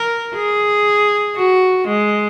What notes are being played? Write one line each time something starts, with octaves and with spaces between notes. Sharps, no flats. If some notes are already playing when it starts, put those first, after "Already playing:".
Already playing: A#4
G#4
F#4
G#3